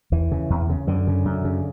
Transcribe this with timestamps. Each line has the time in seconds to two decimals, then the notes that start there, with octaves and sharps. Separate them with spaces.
0.12 E2 E3
0.32 C#3
0.50 E2
0.70 C#3
0.87 F#2 D3
1.07 C#3
1.25 F#2
1.45 C#3